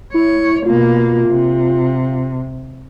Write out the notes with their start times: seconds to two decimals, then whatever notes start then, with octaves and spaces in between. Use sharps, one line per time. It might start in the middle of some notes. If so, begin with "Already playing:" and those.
0.14 E4 C#5
0.66 B2 A#3 F4
1.28 C3